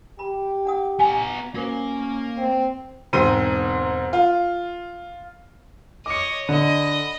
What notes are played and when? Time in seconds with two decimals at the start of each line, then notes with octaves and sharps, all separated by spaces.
0.19 G4 B5
0.65 D4 F#5 D#6
0.99 B3 G#5 A#5
1.54 A#3 C#4 F#4 A#4 C5
2.38 C4
3.13 E1 G#2 C4 C5 D#7
4.13 F4
6.06 C#5 D#5 D6 C#7
6.49 D3 D#5 B5